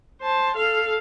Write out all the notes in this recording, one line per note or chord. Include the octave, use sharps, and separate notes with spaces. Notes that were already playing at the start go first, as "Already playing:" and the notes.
C5 A5
A4 F5